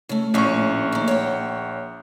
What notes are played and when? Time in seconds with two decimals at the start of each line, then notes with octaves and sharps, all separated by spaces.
0.09 C#3 A3
0.34 A#1 A2 C#4 F5 C#6
0.92 D#2 A#3
1.08 C#5 F#5 G5